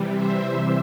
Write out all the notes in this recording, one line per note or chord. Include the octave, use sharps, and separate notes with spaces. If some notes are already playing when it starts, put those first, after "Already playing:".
Already playing: C3 E3 G3
C5 E5